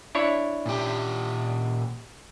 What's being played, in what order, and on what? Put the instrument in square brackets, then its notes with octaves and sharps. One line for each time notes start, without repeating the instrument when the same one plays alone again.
[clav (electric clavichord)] D4 E4 C#5
[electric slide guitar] A#2 G4